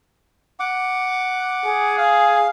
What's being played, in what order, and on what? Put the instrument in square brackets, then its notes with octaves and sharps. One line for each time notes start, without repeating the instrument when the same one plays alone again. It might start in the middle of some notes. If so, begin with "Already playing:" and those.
[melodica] F#5 D6
[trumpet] G#4
[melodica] F5